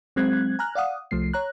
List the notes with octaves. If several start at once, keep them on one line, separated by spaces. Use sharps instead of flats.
F#3 G#3 C4 F#6 G#6
G#5 A#5 F6 F#6
D5 F5 F#5 D#6
C2 F3 A3 C7
C#5 A#5 F#6